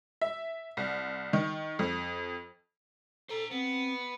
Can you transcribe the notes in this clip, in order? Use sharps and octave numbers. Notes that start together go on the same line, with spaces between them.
E5
C2
D#3
F2
A4 C5 A#5
B3 C4